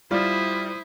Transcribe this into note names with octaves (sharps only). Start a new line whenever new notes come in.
G3 E4 F4 C5 D5 D#6